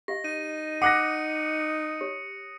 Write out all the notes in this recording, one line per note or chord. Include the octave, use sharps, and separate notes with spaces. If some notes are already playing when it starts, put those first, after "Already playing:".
G4 D#5 F5 A#6
D#4 D#7
F#5 D6 D#6 F#6 A#6 C#7
G4 C#5